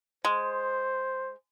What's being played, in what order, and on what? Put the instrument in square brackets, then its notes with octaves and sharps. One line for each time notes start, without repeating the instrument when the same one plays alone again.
[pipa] G#3 [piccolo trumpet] C5